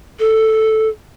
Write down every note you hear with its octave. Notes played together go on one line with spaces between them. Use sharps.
A4